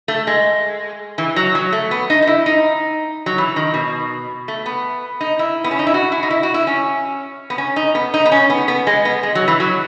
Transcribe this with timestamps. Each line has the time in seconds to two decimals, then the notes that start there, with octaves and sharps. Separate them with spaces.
0.08 A3
0.27 G#3
1.18 E3
1.36 F#3
1.55 F#3
1.73 A3
1.91 B3
2.10 D#4
2.22 D#4
2.27 E4
2.46 D#4
3.26 F#3
3.38 E3
3.56 D#3
3.74 B2
4.48 A3
4.66 B3
5.21 D#4
5.39 E4
5.64 B3
5.71 C#4
5.79 D#4
5.87 E4
5.94 F#4
6.12 E4
6.23 D#4
6.31 E4
6.43 F#4
6.54 E4
6.67 C#4
7.50 B3
7.58 C#4
7.76 D#4
7.95 B3
8.14 D#4
8.25 B3
8.32 C#4
8.50 B3
8.68 B3
8.87 G#3
9.05 B3
9.23 G#3
9.35 F#3
9.48 E3
9.60 F#3